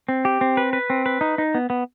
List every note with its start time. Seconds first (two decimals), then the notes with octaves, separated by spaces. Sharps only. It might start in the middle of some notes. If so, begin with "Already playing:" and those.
0.09 C4
0.25 G4
0.41 C4
0.57 B4
0.73 B4
0.90 C4
1.06 B4
1.21 D#4
1.38 D#4
1.54 B3
1.70 B3